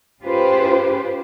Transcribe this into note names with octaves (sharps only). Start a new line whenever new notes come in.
C#4 F4 G4 G#4 B4 C5